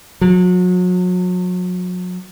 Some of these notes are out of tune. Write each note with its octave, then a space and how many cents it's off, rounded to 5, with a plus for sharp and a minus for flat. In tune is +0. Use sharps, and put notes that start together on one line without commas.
F#3 -35